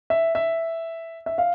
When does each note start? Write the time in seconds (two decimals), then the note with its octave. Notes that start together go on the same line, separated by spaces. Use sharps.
0.10 E5
0.35 E5
1.26 E5
1.38 F5